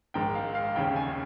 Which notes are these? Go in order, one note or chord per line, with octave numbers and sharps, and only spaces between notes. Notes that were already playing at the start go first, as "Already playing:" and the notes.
A#1 G#2 D#3 G5
F5
F5
F1 D#2 C#3 G5
G#5